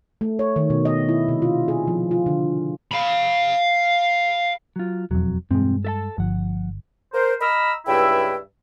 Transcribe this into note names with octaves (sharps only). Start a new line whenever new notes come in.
A3
C#5
D#3
B2
D#5
E4
C3
F4
G#4
F3
F4
D3
F5 B5
F#3 F4
E1 F2 F#3
B1 E2 G2 G#3 C4
A4 E5 A5
G1 F3 F#5
A#4 C5
D#5 A#5 B5 E6 F6
C#2 G2 E4 E5 G5